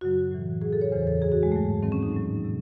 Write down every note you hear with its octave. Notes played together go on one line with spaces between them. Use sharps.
F#2 C#3 F#3 F#4
A2 E3
A2 F#3 G#4
A4
C#5
E2 C#3 E3 C5
A4
F#2 E3 G#4
F#4
G#3
G#2 F#3 A3
G#2 D#3 F#3 C4
C#4
D#4
A2 F#3
C3